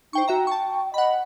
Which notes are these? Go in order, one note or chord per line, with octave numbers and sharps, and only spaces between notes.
D#4 C5 G5 C#6
F#4 E5 G5 A#5
A5 C#6
D#5 F#5 B5